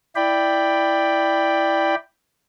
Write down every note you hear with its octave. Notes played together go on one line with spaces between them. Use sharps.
E4 D5 G5 B5